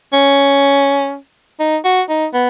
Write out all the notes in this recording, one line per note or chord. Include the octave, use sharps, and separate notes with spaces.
C#4
D#4
F#4
D#4
B3